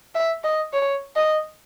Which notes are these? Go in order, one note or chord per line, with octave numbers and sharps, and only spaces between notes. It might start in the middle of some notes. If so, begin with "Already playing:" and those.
E5
D#5
C#5
D#5